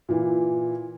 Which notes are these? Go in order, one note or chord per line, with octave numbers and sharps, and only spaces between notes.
A#2 E3